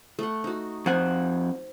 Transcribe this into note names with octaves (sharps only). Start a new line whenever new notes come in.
A3 F#5
D#4 F#4
F2 C5 F#5 G#5 C6